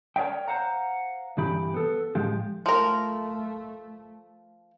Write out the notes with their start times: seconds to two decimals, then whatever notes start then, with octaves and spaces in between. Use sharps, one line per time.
0.16 A#4 C#5 D5 E5 G5
0.48 C5 F5 F#5 A#5
1.37 C2 G2 E3 G4 B5
1.74 B3 A4
2.15 A2 F3 G#3 G4
2.66 F3 A3 A#4